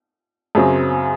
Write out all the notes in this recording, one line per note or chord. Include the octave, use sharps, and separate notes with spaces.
F#2 C#3 F#3 C4